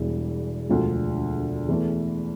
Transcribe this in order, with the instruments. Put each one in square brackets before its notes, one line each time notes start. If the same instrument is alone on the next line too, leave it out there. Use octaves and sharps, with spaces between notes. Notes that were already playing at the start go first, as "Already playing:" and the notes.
Already playing: [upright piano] E1 E2 E3 G3
E1 D2 D3 F3
E2 E3 A3